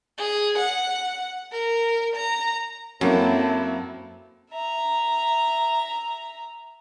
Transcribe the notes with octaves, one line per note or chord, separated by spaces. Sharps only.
G#4
F#5
A#4
A#5
F#2 F#3 A#3 C4 E4 A4
E5 A#5